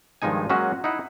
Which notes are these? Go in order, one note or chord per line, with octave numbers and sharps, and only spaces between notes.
G2 D#3 F3 G#3 D#4 G#5
F#3 G#3 A#3 C#4 F#4
D#4 E4 F#5